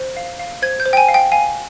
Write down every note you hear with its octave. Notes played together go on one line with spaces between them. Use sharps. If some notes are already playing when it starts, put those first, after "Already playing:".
Already playing: C5
F5
F5
C5 G#6
G6
C5
G5
G#5
F5
G5
F5 G#5